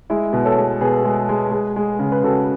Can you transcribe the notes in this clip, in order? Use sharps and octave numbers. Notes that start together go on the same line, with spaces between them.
G#3 E4
B2
A4 C#5
G#3
B2 G#4 B4
G#3
G#3
G#3
G#3
C#3
B4
C#3 F#4 A4